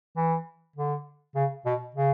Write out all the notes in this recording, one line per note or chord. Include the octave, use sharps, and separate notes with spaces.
E3
D3
C#3
B2
C#3